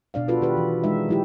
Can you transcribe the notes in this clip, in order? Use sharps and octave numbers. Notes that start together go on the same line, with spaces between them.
B2 D4 D5 F5
F4 F#4 A4 B4
D#3 G4 B4
E3
G#3 D#4 E5
F#3 E4 G4